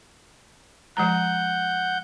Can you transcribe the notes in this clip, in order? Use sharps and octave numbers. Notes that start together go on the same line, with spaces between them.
F3 G#3 F#5 A#5 G6